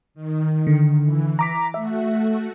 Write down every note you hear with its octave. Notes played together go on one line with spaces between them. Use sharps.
D#3
D3
E3
A#5 D6 B6
A3 F#4 E5